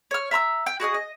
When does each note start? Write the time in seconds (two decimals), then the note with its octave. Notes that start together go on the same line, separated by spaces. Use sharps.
0.11 C#5 F6
0.31 E5 A#5 B5 E6
0.66 G5
0.80 F#4 G#4 D#5 D#6
0.94 D#5